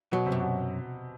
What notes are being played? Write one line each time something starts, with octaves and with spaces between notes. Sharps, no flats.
B2 F#3
C3
F#2
B2